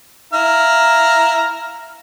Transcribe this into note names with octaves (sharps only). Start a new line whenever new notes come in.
E4 F5 A#5